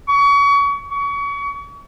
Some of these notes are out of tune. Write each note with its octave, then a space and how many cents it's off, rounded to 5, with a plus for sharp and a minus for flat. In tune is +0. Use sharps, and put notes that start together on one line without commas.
C#6 +30
C#6 +35